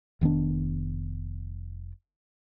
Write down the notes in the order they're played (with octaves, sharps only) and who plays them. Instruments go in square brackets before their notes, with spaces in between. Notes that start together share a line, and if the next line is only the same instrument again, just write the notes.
[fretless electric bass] F1 D#3 B3 D4